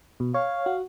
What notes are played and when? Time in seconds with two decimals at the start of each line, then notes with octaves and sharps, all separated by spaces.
0.20 B2
0.34 C#5 F5
0.66 F#4